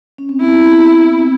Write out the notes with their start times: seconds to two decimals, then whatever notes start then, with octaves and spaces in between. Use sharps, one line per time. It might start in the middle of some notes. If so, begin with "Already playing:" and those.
0.18 C#4
0.29 C4
0.41 B3 E4
1.18 C4